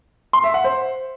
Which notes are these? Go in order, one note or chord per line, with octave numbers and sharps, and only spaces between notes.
C6
E5
F#5
C5